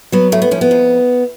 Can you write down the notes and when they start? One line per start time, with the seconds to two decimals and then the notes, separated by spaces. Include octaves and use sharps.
0.12 F#3 B3
0.32 A2 A3
0.42 B3
0.51 F3 C#4
0.61 B3
0.71 F2